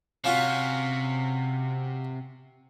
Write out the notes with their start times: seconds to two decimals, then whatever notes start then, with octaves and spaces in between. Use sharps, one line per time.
0.24 C3 C#4 F4 F#4